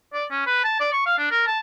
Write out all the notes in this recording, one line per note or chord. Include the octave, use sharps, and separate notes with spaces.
D5
C#4
B4
A5
D5
C#6
F5
D4
A#4
A5